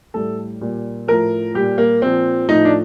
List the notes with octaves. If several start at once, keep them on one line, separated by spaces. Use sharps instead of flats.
A2 G3 A4
A#2 G3
A2 F3 A#4
A#2 G3 G4
A#3
A#2 F3 C4
A2 F3 D#4
D4